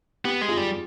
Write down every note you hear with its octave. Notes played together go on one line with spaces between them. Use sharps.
B3 G4
G#3
F4 G#4
G3